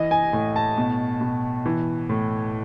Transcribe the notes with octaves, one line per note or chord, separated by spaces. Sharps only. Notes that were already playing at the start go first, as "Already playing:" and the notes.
Already playing: E3 D#5
G#5
A2
A5
B2
B2
E3
A2